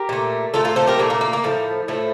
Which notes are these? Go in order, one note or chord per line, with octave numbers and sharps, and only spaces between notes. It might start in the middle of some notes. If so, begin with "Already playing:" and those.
Already playing: G4 A#4
A#2 A3
A#2 A3 F4 A4
F4 A4
A4 C5
G4 A#4
A#2 A3 A#3 D4
A#3
A#3
A#3
A2 F3 A3
A2 F3 A3